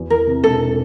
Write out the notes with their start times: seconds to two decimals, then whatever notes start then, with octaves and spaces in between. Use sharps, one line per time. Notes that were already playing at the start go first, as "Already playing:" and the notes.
Already playing: E2 F#4
0.10 E3 A#4
0.27 C3
0.44 E1 A4